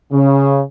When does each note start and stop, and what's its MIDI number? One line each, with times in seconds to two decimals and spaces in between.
0.12 0.60 49